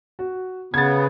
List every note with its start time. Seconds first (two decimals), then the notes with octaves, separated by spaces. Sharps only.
0.19 F#4
0.74 C#3 B3 G#6 A6